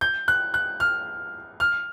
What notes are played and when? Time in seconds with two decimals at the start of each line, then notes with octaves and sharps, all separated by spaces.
0.01 G6
0.28 F#6
0.54 F#6
0.80 F6
1.60 F6